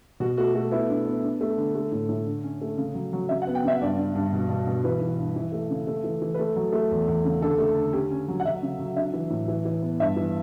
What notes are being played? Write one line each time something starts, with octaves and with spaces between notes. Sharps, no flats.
B2 F#4
A3 F#4
A3 F#4
B3 E4
D4
B3
D4
A3
D3
A3
A2
A2
D3
C#4
A3
C#3
F#3
F#3
C#3 E5
F#5
B3
G5
C#3 E5
G2 D5
D4
G2
B2
B2
B2
E3 B4
E3
G2
E3
A3
C#3
A3
E3
E3
B4
A3 A4
F#3
A3
E2
E2
C#3
D3 A4
A3
D3
C#4 G4
C#4
F#3
F#5
F#3 E5
C#3
F#3
D4 E5
E3
A2
E3
E3
B3
G2 E5
E3